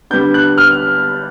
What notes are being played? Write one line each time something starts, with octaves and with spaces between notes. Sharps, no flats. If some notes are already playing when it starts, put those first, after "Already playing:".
D3 G3 B3 D4 G6
F#6
F6